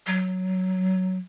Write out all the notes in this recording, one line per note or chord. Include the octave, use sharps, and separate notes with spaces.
F#3